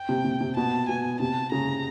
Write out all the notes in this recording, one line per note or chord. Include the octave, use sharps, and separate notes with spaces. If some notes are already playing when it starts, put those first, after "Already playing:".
Already playing: G5
C3
C3
C3
B2 A5
B2 G#5
C3 A5
C#3 A#5